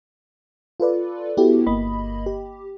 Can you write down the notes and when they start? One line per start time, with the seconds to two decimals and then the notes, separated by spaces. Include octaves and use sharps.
0.80 F4 A4 B4 D5
1.37 B3 E4 F#4 G4 A4 B4
1.67 G1 A#3 D#5 B5
2.26 G4